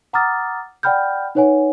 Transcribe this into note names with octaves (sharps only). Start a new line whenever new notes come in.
F#5 A#5 D6 D#6 F6 A6
D5 F#5 G5 B5 F6 G6
D#4 B4 C#5 F#5 G#5